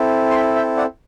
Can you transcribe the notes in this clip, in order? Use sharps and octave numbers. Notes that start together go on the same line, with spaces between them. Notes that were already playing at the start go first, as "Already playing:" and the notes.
Already playing: C4 E4 A4
C6
G5 B5
E5 G5
D5 F#5